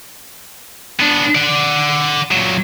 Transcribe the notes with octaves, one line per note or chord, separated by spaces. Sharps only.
B3 D4
D5 F#5
A#2 F#3